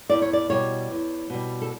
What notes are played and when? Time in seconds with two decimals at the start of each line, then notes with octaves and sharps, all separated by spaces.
0.09 E2 D5
0.22 C#5
0.33 D5
0.50 B2 G3 C#5
0.90 E2
1.30 B2 G3
1.62 A4